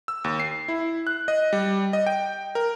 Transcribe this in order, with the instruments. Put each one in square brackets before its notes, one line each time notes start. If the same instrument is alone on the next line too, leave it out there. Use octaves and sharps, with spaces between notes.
[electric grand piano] E6
D#2
C7
E4
F#6
D#5
G3
D#5
G5
A#4